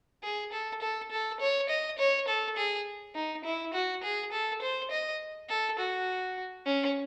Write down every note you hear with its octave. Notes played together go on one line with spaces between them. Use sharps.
G#4
A4
A4
A4
C#5
D#5
C#5
A4
G#4
D#4
E4
F#4
G#4
A4
C5
D#5
A4
F#4
C#4